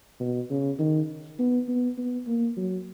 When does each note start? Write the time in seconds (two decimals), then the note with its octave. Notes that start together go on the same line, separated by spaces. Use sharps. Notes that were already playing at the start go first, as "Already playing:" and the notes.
0.20 B2
0.50 C#3
0.79 D#3
1.39 B3
1.68 B3
1.98 B3
2.27 A#3
2.57 F#3